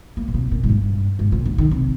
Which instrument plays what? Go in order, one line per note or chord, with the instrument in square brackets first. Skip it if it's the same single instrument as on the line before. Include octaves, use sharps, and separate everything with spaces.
[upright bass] A#3
A#2
C3
A#2
G#2
G2
G#2
A#2
D3
D#3
C3